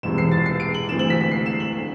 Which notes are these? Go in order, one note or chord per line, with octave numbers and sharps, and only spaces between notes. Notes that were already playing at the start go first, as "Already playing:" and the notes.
E1 E2 C3 E3 E7
C7
A6
C7
D7
F#7
D2 C3 E3 E7
F#7
B6
B6
C7
E7
F#7
D3